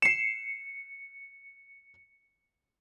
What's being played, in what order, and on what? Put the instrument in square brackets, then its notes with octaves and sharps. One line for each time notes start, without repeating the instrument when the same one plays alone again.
[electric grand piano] C7 E7 [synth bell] C#7